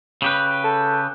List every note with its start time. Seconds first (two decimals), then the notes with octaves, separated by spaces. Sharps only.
0.22 C#3 G4 B4
0.64 A4